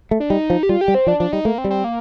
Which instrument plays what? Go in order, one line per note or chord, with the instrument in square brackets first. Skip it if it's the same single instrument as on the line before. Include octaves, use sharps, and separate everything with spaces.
[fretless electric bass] A3
[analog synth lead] D4
[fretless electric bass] G3 [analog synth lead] D#4
[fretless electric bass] F3
[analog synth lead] G4
[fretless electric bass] G3 [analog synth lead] F4
[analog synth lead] G4
[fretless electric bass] G3
[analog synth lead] C4
[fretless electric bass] F3 [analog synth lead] D4
[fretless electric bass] F3 [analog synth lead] D4
[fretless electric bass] G3 [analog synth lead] D#4
[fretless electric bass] A3 [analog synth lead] A#3
[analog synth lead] C4
[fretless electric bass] G3
[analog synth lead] C4
A#3